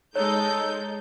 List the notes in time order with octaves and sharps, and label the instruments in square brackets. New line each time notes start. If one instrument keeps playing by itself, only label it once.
[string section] G#3 G6 [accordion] D#4 A4 [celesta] C#5